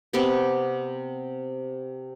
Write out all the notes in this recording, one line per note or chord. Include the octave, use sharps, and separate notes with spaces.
C3 B3 C4 G4